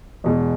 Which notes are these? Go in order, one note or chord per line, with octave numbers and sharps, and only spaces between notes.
E2 B2 G#3